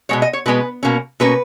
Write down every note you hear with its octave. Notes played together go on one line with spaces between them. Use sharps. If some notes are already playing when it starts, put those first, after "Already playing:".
B2 G#3 B3 C#5
D#5
C#5
B2 G#3 B3 B4
B2 A#3 C#4
B2 A#3 C#4 B4